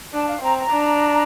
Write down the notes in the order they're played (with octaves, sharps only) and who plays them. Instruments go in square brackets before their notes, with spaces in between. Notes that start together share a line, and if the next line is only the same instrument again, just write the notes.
[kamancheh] D4 [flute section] A5
[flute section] F5
[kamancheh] C4 [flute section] A#5
[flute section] A#5
[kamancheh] D4